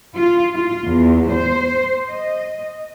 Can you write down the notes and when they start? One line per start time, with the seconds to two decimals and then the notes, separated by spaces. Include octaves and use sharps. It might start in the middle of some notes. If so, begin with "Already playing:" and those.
0.17 F4
0.55 F4
0.87 E2
1.31 C5
2.09 D#5